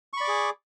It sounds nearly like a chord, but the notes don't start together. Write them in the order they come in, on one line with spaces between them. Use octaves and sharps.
C#6 B5 D5 D6 G#4